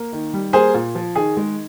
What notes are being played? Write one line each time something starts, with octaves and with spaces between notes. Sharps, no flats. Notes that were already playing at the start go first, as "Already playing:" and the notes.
Already playing: A#3
D#3
G3
A#3 G#4 C5
A#2
F3
D#3 G#4
G#3